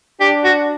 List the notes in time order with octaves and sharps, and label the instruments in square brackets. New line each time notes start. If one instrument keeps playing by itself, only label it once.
[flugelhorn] D4 [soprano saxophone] G4
[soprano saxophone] F#4